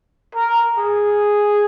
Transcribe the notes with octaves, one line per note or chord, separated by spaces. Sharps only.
A#4
G#4